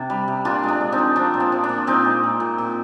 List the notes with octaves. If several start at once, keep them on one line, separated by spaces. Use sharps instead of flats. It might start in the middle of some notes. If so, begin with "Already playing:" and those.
Already playing: C3 D4
G3
C3
A#2 D4 F4
G#3 D4
G#3
C4 D#4
F3
F3 D4
A#2
C4
F3
D4
A#2
A#2 C4 D#4
G#3
A#2
A#2
A#2